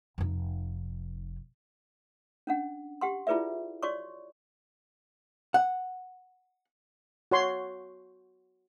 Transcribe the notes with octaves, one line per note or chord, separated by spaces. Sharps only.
F1 D#4
C#4 D4 F#5
G4 F#5 C6
E4 F4 G#4 B4 D5 E5
F#4 C#5 D5 C6 C#6
F#5
F#4 C#5 C6